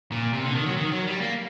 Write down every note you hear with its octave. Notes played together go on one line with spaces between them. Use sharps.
A#2
C3
D3
D#3
F#3
D#3
F#3
G3
A#3